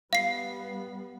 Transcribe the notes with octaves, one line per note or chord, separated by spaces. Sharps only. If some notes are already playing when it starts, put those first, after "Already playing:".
G3 B3 F5 C7